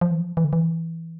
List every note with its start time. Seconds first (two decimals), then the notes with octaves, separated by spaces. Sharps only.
0.01 F3
0.11 E3
0.20 F3
0.37 E3
0.44 D3
0.53 E3